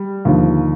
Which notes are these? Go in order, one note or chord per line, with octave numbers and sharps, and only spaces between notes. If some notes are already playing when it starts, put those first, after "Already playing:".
Already playing: G3
D#2 D3 F3